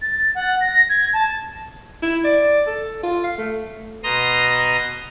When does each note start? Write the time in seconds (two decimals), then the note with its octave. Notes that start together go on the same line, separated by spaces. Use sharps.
0.02 A6
0.35 F#5
0.61 A#6
0.89 G#6
1.13 A5
2.02 E4
2.24 D5
2.67 A4
3.03 F4
3.24 F5
3.38 A3
4.04 B2 A#5 C6 D#6 A#6